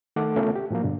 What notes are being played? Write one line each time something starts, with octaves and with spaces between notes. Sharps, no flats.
D#3 A3 A4 F#5 D6
C#3 A3 B3 C#4 F4 A#4
G4
A2 F3 F#3 A#3
G2 B2 D3